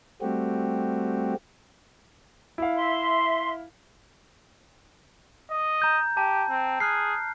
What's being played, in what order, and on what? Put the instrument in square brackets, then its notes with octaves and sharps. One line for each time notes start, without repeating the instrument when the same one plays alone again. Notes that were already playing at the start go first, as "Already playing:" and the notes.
[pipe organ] G3 A3 C4 F#4 G4
[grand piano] E4 F5
[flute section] E5 C6
[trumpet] D#5
[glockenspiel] A#5 G6
[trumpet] G4 [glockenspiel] A5
[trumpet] C4
[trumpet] G#4 [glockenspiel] F6 F#6 C7